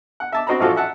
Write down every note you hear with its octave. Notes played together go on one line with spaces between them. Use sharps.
F#5
E5 A5 D6
C4 F#4 C5 D#5 A#5 B5
A1 F3 F4 F#4 A4
E5 F#5 A5